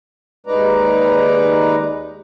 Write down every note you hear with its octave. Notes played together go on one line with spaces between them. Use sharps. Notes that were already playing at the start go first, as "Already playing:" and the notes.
D#2 G#3 D#4 B4 D5 A#5